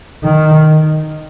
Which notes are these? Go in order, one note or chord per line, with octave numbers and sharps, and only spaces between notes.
D#3